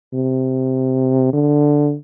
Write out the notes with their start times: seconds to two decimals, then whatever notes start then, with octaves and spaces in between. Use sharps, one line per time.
0.14 C3
1.33 D3